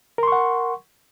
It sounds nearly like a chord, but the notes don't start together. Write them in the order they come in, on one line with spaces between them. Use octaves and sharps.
A#4 C6 C#6 F#5